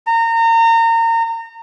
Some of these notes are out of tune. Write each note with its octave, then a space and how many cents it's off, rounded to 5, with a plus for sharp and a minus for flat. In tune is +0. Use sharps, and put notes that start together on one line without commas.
A#5 -30